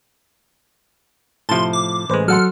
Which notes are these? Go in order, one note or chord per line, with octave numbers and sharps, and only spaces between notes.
A2 C3 F3 A5 C6
D6
A1 G#3 B4 C5
F#3 A4 F#5 C6 F6